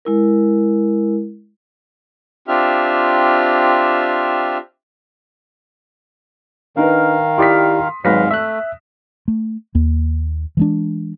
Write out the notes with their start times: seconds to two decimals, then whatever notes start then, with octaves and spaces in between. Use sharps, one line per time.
0.05 G#3 E4 A#4
2.48 C4 D4 F4 G4 E5 F6
6.76 D#3 D4 D#4 A#4 B4 F5
7.38 E4 G4 D5 C6 D#6 B6
8.05 G#1 G#2 F#3 G#3 B4 F5 A#6 B6
8.31 A3 E5 E6 F#6
9.28 A3
9.75 D#2 A#3
10.57 E3 G#3 D4